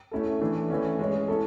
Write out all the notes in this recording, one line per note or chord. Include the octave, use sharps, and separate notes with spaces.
A3 C#4 E4 A4
E3 A3 D4
E3 A3 C#4
G#3 C#4 G#4 C#5
C#4 E4 A4